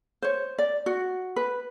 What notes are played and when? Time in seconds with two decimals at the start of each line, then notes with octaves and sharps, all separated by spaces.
0.22 C5 C#5
0.58 D5
0.86 F#4
1.36 B4